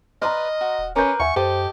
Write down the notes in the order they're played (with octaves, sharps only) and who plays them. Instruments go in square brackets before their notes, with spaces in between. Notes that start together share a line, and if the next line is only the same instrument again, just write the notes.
[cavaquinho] B4 D5 [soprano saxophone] D#5 [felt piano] A#5 C6 F6
[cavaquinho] F#4
[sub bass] D#1
[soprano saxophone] C#4 [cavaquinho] A#4 B4 C6 [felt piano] D6 G6
[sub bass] D#2 [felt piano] E5 F#5 G#5 [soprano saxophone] C#6
[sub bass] F#2 [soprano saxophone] G4 [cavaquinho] A4 D#5 [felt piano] C5